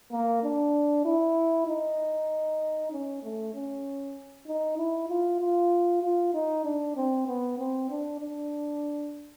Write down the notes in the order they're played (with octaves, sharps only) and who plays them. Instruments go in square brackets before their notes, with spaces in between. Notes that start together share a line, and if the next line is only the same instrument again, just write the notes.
[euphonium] A#3
D4
E4
D#4
C#4
A3
C#4
D#4
E4
F4
F4
F4
D#4
D4
C4
B3
C4
D4
D4